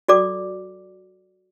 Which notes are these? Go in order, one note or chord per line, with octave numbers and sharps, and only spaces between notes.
F#4 A4 D5 D6